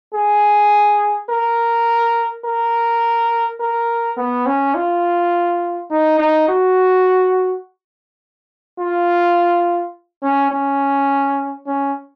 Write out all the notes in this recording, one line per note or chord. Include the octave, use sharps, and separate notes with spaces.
G#4
A#4
A#4
A#4
B3
C#4
F4
D#4
D#4
F#4
F4
C#4
C#4
C#4